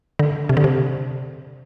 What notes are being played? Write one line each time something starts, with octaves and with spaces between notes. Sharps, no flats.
D3
C3
D3
C3